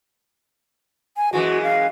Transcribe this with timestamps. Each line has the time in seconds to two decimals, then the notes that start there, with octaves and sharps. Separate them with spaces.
1.17 G#5
1.33 F#2 E3 G#3 F#4
1.63 F5